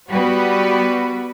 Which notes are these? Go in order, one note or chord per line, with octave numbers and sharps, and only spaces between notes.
G3 B3 F#4 B4